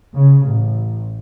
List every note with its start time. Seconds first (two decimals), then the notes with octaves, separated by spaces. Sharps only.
0.16 C#3
0.48 A1